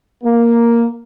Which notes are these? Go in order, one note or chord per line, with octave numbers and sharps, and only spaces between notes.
A#3